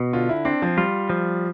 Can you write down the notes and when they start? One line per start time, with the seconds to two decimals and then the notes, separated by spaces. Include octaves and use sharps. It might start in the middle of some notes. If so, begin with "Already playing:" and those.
Already playing: B2
0.13 D3 F4
0.29 E4
0.45 C4 D4
0.62 F3
0.77 G3 F4
1.10 F3